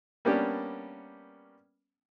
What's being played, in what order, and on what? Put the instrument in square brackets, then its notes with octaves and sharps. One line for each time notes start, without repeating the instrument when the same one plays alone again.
[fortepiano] G3 A#3 B3 C#4 D4 G4